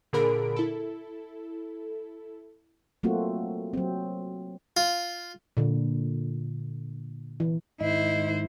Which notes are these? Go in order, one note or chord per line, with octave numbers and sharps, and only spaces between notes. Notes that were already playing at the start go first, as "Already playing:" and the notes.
A#2 D3 G#4 A#4 B5 D7
E4 A4
F#3 A3 A#3 C4 F4 F#4
F#3 C4
F4
A#2 D3
E3
G#2 D#3 E4 C5 D#5